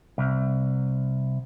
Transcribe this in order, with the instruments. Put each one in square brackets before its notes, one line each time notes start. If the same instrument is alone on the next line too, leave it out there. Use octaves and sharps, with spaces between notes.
[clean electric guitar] C2